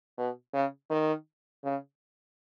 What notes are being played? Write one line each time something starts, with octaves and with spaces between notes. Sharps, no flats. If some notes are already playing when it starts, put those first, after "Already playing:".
B2
C#3
D#3
C#3